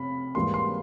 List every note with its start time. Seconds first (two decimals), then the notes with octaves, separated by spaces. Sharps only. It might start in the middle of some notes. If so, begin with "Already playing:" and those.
Already playing: F2 C3 B5
0.35 G#2 E3 G3 A#3 C6
0.54 C6